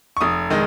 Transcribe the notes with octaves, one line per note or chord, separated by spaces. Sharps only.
C#6
F1 D#6
D#3 G#3